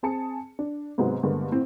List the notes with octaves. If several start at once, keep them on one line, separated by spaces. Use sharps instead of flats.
C4 G#4 A5 C#7
D4
G#2 C3 F#3 G#3 B3
G2 D3 G#3 A#3 B3
A2 C4